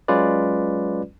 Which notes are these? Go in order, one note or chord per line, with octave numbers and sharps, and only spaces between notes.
F#3 G#3 C#4 F4 B4 D5